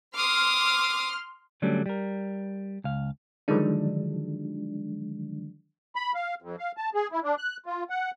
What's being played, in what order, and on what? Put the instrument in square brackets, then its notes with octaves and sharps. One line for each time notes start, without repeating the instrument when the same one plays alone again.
[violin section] C6 F6 [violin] D6 D#6
[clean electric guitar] D3 F#3 G3 A3 C#4 D4
G3 A#4
C#2 F5
[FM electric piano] D3 D#3 F3 F#3 G#3 D4
[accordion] B5
F5
F2
F5
A5
G#4
E4
D4
F#6
F4
F#5